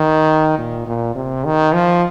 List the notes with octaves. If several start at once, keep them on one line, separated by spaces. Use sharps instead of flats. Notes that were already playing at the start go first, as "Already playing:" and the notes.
Already playing: D#3
A#2
A#2
C3
D#3
F3